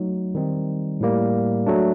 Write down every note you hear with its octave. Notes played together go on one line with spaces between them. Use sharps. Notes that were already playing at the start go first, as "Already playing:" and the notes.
Already playing: F#3 A3 D#4
D#3 G3 C4 D#4
A2 G3 A#3
F#3 A3 D4